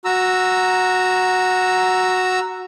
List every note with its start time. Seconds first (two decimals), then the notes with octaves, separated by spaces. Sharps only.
0.05 F#4 A#5 E6